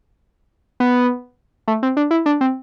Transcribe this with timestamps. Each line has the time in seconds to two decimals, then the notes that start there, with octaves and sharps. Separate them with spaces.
0.80 B3
1.68 A3
1.83 C4
1.97 D4
2.11 E4
2.26 D4
2.41 C4